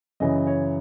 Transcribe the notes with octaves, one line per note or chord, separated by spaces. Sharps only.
F#2 C#3 E3 D#5
C#5